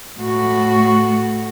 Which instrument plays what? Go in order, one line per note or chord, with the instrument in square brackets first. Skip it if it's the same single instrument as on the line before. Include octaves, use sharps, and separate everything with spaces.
[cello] A2 F#4